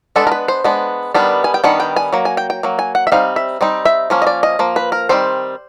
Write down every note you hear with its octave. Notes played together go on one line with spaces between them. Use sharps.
G#3 B3 D4 A4
A#4
B4
C5
G#3 B3 D4
D#3 G3 B3 D4
G#5
G5
D#3 G3 B3 D4 F#5
G5
G#5
F#3 A#3
G#5
G5
G5
F#3 A#3
G#5
F#5
E5
G3 C4 D#4 F5
E5
G3 C4 D#4
E5
F3 A#3 C#4
D#5
D5
D#5
F3 A#3
B4
A#4
D#3 G3 C4 C5